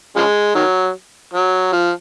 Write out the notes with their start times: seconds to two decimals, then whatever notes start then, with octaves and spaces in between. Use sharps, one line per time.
0.16 C#3 F3 G#3
0.55 D#3 F#3
1.33 F#3
1.73 F3